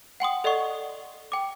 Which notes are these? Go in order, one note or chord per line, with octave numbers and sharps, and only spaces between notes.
F#5 G5 C6 D#6
A4 D5 D#5 F#5 C#6
G5 D6